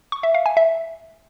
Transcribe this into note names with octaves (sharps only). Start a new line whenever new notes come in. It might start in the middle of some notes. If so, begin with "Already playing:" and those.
C#6
E5
F5
G#5
E5